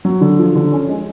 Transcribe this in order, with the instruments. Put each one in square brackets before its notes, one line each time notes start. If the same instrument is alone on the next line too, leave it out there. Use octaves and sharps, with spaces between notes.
[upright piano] F#3
D3
F3
D3
C#4
G#3